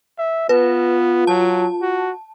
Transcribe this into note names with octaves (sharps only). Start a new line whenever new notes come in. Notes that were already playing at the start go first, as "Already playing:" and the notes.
E5
B3 F4 B4
F#3 A5
F#4